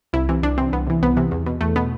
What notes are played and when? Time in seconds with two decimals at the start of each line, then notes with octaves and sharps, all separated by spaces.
0.13 C2 E4
0.29 C3 E3
0.43 C2 D4
0.58 C3 E3 C4
0.73 C2 B3
0.87 C3 E3
1.03 C2 B3
1.17 C3 E3
1.31 E2
1.46 B2
1.61 E2 A3
1.76 B2 B3